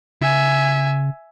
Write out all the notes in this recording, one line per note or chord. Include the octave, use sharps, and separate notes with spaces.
C#3 E5 G#5